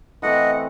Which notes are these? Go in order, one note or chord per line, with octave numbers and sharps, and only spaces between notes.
E3 A3 C4 D#5 F#5